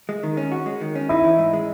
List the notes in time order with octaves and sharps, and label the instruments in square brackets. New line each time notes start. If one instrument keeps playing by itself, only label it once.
[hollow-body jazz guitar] G#3
D#3
C#4
F#4
G#3
D#3
C#4
[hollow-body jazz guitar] D#4 [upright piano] E4
[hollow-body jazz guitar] E3
G#2
G#3